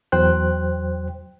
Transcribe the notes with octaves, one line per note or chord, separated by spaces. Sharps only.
E2 F#3 C5 G5 F#6